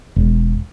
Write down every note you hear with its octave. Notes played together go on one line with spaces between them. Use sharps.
E1